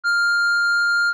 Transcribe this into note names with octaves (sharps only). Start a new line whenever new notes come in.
F6